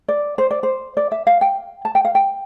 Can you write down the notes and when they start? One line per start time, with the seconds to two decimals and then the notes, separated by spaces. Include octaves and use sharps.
0.08 D5
0.38 C5
0.51 D5
0.63 C5
0.97 D5
1.12 E5
1.27 F5
1.41 G5
1.85 A5
1.95 G5
2.05 F5
2.15 G5